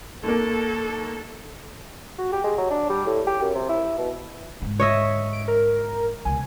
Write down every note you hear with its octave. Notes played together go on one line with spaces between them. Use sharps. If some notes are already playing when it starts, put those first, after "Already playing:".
D#2 A#3 A4
F#4
G4
G#3
F#3
D4
G3
A2
G4
F#2
C3
E4
B2
G#2 D3
C#5 D#5 E5
D7
A#4
C#2 B2 G#5